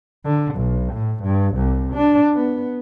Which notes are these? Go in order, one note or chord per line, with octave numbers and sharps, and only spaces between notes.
D3
B1
A2
G2
C2
D4
B3